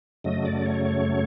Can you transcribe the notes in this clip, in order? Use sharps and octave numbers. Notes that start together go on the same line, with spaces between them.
F#2 C#3 F#3 A3 D#5
D5
C#5
C#5